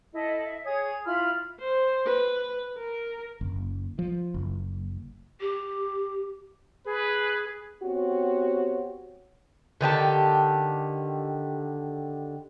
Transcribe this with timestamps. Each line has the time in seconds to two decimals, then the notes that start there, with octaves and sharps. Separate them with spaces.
0.14 E4 A4 D#5
0.44 E5
0.64 G#4 C#5 D#6 G#6
1.05 E4 F4 B5 F6
1.59 C5
2.06 B4
2.77 A#4
3.41 F#1
3.99 F3
4.34 F#1
5.40 G4
6.86 G#4 B4
7.83 B3 C4 F#4 G4 C#5
9.81 D3 D#3 G4 A5